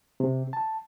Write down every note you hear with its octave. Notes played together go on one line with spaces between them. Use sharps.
C3
A5